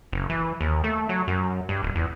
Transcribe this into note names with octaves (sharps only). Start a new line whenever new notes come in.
F#1
E3
D#2
A3
F#3
F#2
G2
D#1
E2